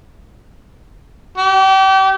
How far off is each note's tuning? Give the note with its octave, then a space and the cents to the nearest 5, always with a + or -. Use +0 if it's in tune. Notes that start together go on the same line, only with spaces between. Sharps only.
G4 -35